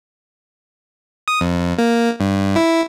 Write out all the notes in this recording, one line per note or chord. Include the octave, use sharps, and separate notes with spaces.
D#6
F2
A#3
G2
E4